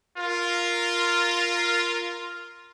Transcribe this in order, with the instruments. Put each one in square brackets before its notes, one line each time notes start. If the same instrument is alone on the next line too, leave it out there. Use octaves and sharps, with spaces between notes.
[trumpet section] F4 A#4